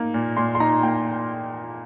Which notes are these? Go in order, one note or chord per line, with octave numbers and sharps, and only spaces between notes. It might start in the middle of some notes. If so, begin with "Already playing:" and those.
Already playing: A#3 D#4
A#2
A#2 C6
C6
D#4 A#5
A#3 G5